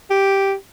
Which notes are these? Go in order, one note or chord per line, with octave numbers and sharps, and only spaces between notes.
G4